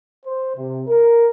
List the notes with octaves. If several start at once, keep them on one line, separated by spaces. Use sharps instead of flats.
C5
C3
A#4